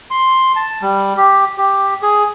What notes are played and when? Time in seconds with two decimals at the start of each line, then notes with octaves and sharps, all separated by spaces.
0.11 C6
0.56 A5
0.82 G3
1.17 G4
1.57 G4
2.02 G#4